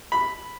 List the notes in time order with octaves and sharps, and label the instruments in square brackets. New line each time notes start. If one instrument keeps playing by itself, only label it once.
[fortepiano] B5